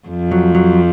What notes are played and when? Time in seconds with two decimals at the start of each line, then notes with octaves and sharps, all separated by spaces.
0.08 F2
0.31 F#3
0.55 F#3